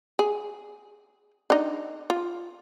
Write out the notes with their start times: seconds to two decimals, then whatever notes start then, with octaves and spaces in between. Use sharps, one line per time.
0.19 G#4
1.50 D4 D#4
2.10 F4